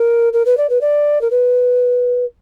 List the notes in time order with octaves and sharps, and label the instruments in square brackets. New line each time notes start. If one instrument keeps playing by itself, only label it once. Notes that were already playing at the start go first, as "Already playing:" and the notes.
Already playing: [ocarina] A#4
A#4
B4
D5
B4
D5
A#4
B4